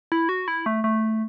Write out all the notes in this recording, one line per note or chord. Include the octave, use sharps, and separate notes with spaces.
E4
F#4
E4
A3
A3